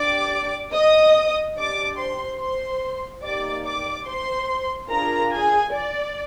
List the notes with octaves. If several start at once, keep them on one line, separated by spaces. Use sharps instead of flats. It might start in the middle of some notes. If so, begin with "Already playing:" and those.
Already playing: D4 G4 D5 D6
D#5 D#6
D4 G4 D5 D6
C5 C6
C5 C6
A#3 D#4 G4 D5 D6
D5 D6
C5 C6
D4 F4 G#4 A#4 A#5
G#4 G#5
D5